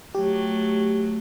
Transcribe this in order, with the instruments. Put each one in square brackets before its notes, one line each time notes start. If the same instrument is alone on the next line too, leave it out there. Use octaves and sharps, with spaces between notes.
[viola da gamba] F#3 A3 [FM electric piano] G4